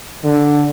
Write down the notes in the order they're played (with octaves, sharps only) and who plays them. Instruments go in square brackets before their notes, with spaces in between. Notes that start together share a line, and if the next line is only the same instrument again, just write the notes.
[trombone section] D3